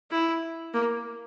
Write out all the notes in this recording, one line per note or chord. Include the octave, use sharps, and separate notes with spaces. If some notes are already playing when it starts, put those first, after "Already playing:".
E4
A#3